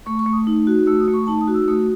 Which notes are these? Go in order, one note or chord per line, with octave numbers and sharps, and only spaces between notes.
A3 C#6
C#6
A3
D#6
D#4
F#4
A3 E6
D#6
A3
C#6
D#4 A5
D#6
F#4
E6
A3 D#6